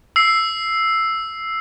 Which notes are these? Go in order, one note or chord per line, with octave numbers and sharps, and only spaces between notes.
E6 C7